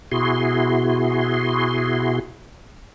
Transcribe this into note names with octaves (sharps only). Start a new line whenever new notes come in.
B2 E4 F#4 G#4 C6